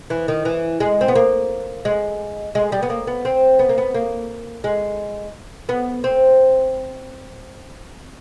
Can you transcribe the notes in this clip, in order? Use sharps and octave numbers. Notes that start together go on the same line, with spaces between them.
E3
D#3
E3
G#3
C4
B3
A#3
G#3
G#3
G3
B3
A#3
B3
C4
B3
A#3
B3
A#3
G#3
B3
C4